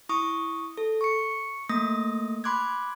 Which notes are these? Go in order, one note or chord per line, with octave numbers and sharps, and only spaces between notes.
E4 C#6 D#6
A4
C#6 C#7
A3 A#3 D#6 A#6
B5 C6 D6 F#6 G#6